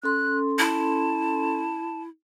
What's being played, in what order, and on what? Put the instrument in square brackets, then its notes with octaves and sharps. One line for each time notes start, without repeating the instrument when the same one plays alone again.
[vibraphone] C#4 A4 C6 [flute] F#6
[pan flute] E4 [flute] A5